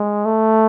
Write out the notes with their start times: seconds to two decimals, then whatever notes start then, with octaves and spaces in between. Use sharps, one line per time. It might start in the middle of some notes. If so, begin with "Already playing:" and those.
Already playing: G#3
0.25 A3